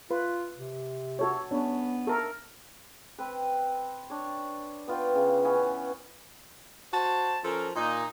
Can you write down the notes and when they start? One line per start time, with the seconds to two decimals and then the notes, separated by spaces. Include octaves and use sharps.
0.11 F4 B4
0.56 C3
1.19 F#4 A4 C#5
1.51 B3 C#4 D4
2.07 A4 A#4
3.18 C4 B4
4.10 D4 C#5
4.88 B3 F4 G5
5.15 C#3
5.44 E3 B3 C#4
6.93 F#4 C5 A5
7.43 F3 C#4 A4 A#4
7.75 A#2 D#4